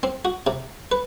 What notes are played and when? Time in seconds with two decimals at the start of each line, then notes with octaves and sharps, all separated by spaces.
0.03 C4
0.25 F#4
0.47 C3
0.92 B4